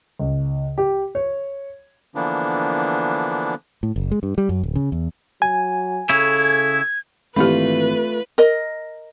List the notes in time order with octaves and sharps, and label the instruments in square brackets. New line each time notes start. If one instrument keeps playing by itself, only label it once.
[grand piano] C#2
G4
C#5
[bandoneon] D3 E3 F3 A#3 B3 D4
[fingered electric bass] A2
F#1
G#3
G2
G3
F#2
D1
C#3
E2
[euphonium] F#3 [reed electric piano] G#5
[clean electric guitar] C#3 E4 [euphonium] A4 [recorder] G#6
[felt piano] G#1 E3 [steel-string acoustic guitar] A3 F4 [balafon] G4 B5 [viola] B4
[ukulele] A#4 D#5